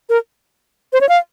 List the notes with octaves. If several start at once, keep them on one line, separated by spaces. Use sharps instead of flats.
A#4
C5
C#5
F5